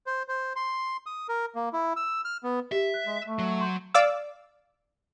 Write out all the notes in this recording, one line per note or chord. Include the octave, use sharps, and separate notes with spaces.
C5
C5
C6
D#6
A#4
A#3
E4
E6
F6
B3
G4 E5
F#6
G#3
A3
F#3
C6 G6
D5 F5 D6 E6